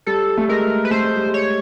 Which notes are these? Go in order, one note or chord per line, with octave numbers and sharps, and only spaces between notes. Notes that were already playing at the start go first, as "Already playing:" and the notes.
G3 A4
A3
G#3 A#4
B4
A3 C5
G#3
G3
G#3
C#5